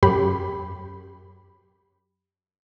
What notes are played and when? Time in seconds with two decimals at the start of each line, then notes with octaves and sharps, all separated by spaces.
0.03 F#2 G4 B5